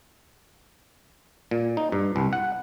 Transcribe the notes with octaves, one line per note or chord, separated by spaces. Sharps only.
A#2
D#4
G2
C2
F#5